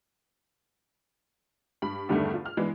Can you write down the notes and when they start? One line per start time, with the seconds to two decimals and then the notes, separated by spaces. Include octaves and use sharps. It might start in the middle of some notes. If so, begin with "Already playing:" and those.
1.82 G2 B5
2.09 E2 G2 D3 D#3 G3 A3
2.33 F4
2.45 F6
2.57 E3 G#3 B3 D4